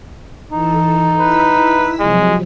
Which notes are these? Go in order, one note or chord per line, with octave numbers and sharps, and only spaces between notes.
E3 D#4 A4
E4 B4 E6 B6
C3 F3 F#3 G#3